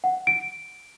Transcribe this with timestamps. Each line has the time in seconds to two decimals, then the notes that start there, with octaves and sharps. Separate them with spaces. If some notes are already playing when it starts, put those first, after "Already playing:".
0.04 F#5
0.27 D7